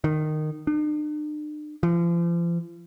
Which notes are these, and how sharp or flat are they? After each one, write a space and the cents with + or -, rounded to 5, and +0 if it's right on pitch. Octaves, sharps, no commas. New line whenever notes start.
D#3 -15
D4 +45
F3 -40